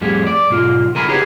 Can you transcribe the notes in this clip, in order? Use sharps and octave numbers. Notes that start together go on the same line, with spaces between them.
F2 A2 G3 G#4
D5
B1 G#2 F4
C#3 A#4 G#5 A#5 B5
E4 G4 G#4 B4 C#5